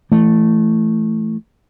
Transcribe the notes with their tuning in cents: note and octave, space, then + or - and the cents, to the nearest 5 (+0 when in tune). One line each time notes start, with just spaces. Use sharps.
E3 +20 A3 +0